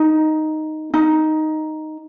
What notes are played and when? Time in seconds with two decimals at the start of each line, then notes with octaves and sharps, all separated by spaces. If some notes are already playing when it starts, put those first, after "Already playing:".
Already playing: D#4
0.94 D#4